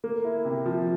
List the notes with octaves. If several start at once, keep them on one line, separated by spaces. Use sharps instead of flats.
A#3
E4
C3
F3